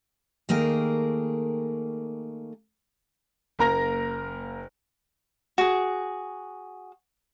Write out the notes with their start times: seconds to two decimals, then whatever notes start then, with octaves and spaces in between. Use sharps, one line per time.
0.49 D#3 A3 A#3 G#4 A#4 G5
3.59 F#1 A#3 A#4 A#5 F6 A#6
5.58 F#4 G#4